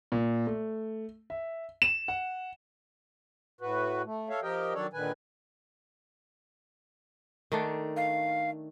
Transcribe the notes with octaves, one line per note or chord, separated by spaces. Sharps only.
A#2
A3
E5
E7
F#5
A2 F#4 B4
A3
A4 C#5 E5 F5
F3 G4 A#4 D#5 G5
D#3 F#3 D4 A4 C#5 D5
A#2 D3 D#3 B4 G#5
D#3 A3 D4
F5